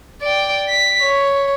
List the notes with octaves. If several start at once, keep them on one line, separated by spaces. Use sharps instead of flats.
D5 G5
B6
C#5